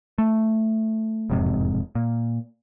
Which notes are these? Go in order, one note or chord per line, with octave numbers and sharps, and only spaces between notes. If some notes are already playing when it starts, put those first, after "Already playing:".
A3
E1 F2 G#2 C3
A#2